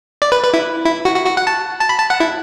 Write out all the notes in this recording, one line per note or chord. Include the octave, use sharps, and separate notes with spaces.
D5
B4
B4
E4
E4
F#4
F#4
F#4
F#5
A5
A5
B5
A5
F#5
E4